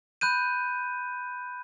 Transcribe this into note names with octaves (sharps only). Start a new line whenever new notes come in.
B5 F#6 G6 D#7